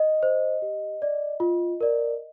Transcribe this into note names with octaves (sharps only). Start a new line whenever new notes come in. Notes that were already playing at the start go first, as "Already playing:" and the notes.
Already playing: D#5
C5
G4
D5
F4
A#4 D5